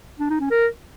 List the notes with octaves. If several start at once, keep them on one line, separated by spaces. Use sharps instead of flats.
D4
D#4
C#4
A#4